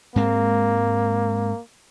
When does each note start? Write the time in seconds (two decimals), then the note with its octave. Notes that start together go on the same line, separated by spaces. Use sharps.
0.16 G#2 G#3 A#3 C4